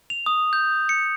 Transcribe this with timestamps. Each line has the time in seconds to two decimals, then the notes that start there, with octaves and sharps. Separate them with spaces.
0.10 F7
0.26 D#6
0.53 G6
0.89 C#7